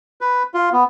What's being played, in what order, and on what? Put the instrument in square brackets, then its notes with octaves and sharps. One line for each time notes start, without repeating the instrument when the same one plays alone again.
[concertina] B4
F4
B3